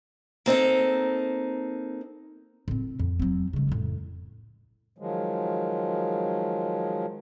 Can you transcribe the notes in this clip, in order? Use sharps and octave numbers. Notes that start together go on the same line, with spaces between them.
A#3 C4 D#4 A4
A2 C4
F2
F#3 C4
C#3 G#3
F2 A2
D#3 F3 F#3 G#3